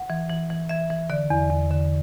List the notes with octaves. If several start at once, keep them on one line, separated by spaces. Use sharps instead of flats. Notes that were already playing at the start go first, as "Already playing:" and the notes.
Already playing: F#5
E3
E3
E3
E3 E5
E3
D3 D5
E2
E2
D3